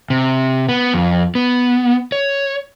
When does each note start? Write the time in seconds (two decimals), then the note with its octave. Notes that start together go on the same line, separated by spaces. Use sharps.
0.10 C3
0.69 B3
0.94 F2
1.35 B3
2.12 C#5